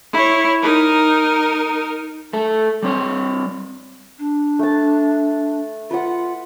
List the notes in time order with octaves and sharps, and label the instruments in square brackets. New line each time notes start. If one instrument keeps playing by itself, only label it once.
[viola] E4 C#5
D#4 A#4
[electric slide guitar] A3 A4
G3 C4 C#5
[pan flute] D4
[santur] A3 A5
[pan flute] F4 [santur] B4 F#5